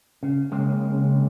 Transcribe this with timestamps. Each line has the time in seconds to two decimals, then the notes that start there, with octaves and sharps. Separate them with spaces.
0.23 C#3
0.52 C#3 G#3 A#3 C4